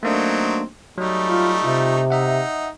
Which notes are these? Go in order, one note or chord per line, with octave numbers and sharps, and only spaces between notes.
F#3 A3 A#3 C4 D4 D#4
F#3 G3 A3 D#4
F4
C3 F4
D#4 E5 F#5